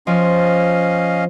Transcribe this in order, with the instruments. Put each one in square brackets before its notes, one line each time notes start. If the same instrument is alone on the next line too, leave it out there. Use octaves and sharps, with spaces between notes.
[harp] F3 [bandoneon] C#4 D#5 F5